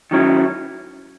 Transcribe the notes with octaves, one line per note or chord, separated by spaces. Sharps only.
D#3 F#3 C#4 E4